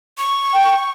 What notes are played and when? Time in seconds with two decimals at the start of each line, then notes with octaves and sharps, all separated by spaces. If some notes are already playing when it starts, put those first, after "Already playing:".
0.18 C#6
0.53 G5